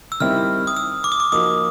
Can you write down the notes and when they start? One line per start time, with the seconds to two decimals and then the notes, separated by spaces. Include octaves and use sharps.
0.12 E6
0.20 D#3 G3 C4 E4 F6
0.67 D#6
0.77 E6
1.04 D6
1.12 D#6
1.20 D6
1.32 F3 A#3 D#4 F#4 D#6